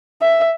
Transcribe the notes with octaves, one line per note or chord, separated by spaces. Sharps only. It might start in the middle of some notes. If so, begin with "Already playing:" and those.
E5